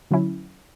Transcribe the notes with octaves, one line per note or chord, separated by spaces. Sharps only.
D3 F#3 C#4 E4